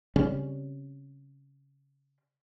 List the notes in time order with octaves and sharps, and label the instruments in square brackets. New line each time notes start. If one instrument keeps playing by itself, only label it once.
[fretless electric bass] C#3 G3 C4 C#4